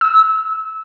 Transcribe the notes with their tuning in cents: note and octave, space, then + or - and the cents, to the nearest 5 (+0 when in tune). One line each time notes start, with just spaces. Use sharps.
E6 -25